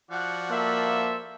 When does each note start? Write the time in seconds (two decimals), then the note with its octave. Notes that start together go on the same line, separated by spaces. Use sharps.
0.11 F3 F#4 D5 F#5
0.50 A#3 A4 C5 E5